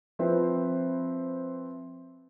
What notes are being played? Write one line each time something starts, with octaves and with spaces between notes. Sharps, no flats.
F3 C4 E4 B4 C5